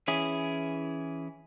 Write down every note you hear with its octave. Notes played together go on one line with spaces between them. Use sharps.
E3 C#4 E4 G#4